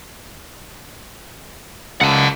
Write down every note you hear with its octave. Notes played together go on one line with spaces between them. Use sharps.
C#2 F#5 A5